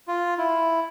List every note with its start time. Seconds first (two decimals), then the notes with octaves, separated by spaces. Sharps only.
0.08 F4
0.38 E4